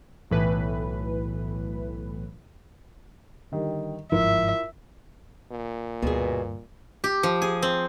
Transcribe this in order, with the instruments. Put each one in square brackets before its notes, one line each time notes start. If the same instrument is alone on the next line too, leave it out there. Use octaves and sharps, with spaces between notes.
[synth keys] B1 A2 E3 B4
[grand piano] D3 D#3 G3
[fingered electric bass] G1 G#2 F3 [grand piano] E4 F4 A#4 [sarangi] E5
[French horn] A#2
[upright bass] D2 G2 [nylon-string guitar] B2 G#4
[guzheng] G4
F3
G#4
C4